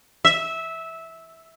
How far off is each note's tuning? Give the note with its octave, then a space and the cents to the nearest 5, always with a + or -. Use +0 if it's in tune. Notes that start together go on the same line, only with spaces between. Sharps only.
E5 -15